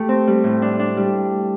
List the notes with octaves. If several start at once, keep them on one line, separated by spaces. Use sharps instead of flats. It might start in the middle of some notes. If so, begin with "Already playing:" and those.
Already playing: A3 G4
C4
G3
A2
D4
D4
G3